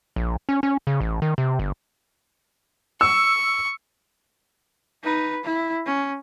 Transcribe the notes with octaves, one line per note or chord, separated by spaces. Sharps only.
A#1
C#4
C#4
C#3
A1
D#3
C3
G1
C#6 E6
D#4 B4
E4
C#4